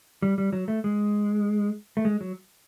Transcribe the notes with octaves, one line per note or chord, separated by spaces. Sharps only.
G3
G3
F#3
A3
G#3
A3
G#3
F#3